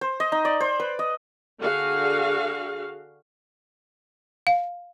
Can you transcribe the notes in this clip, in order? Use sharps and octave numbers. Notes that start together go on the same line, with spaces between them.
C5
D#5
D#4
D5
C5
B4
D#5
D3 F#4 G#4 F5
F5